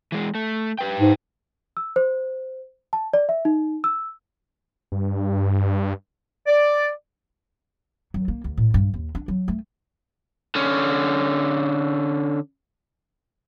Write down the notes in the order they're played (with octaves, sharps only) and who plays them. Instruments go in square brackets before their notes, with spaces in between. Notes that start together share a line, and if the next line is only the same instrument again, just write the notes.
[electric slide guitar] E3 G#3
A3
G4 B4 G5
[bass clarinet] G#2
[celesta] E6
C5
A5
D5
E5
D#4
E6
[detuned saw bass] G2
[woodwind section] D5
[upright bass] F#3
A#3
D2
A2
G2
D#2
D4
F#3
A3
[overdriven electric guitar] D3 C#4